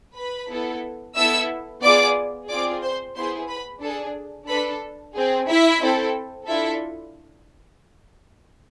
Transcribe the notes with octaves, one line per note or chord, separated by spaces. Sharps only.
B4 B5
B3 E4 A4
B3 E4 A4 E5 E6
B3 F4 G#4 D5 D6
C4 F4 G#4 D5 D6
C5 C6
B3 E4 G#4 C5 C6
B4 B5
D4 G#4 A4 A5
D4 A4 B4 B5
C4 G#4
E4 E5
C4 E4 A4
D4 E4 F4 A4 E5